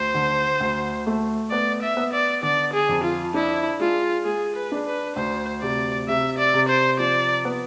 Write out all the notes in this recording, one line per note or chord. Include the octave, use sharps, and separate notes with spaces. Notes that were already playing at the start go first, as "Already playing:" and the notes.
Already playing: D2 C5
D3
D2
A3
B3 D5
E5
B3
D5
D3 D5
G#4
F2
F4
D4 E4
G#3 F4
G#3 G#4
B4
D4
B4
D2 C5
C3 D5
C3 E5
D5
C3
C5
F3 D5
B3